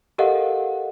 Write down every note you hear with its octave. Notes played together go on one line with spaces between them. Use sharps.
G4 A4 A#4 D#5 F5 F#5